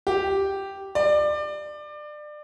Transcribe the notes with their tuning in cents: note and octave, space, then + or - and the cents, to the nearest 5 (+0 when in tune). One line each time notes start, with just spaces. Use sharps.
G4 -5
D5 +25